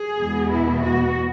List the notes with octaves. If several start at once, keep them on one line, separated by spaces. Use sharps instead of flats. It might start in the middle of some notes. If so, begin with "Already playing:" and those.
Already playing: G#4
E2 B2 G#3 B3
E4
F#4